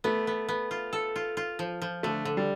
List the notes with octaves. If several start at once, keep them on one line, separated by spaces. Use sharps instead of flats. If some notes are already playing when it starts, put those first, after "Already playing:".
A3 B3
B3
B3
F4
A4
F4
F4
F3
F3
D3 A3
D3
G3